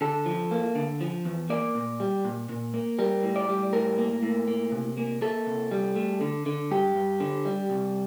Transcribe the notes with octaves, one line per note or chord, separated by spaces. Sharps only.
D3 A4
F3
A#3
D3
F3
E2
A#3 D5
A#2
G3
A#2
A#2
A#3
G3 A#4
A2
D5
G3
A2 A#4
A#3
A2
A#3
C3
A#3
A#3 A4
C3
G3
A3
D3
D3
G2 G4
G2
D3
G3
C2